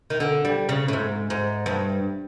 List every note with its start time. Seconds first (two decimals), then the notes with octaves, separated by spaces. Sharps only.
0.10 D#3
0.20 D3
0.45 G3
0.69 C#3
0.88 A2
0.93 G#2
1.30 G#2
1.66 G2